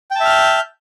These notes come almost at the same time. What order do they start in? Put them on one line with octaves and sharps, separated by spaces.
G5 A5 E5 F6 G6